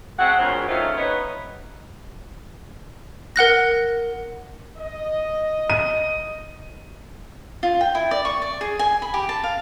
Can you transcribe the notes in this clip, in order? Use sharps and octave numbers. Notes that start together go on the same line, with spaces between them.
A3 C4 F#4 G#4 F#5
D2 A#2 C#3 C5 C#5
F#3 A3 C4 C#4 D#4 F4
B3 D#4 C#5
A#4 F#5 F#6 A#6
D#5
D#7
F4
G5
E4
D5
C#6
D5
G#4
G#5
B5
G4
A5
F5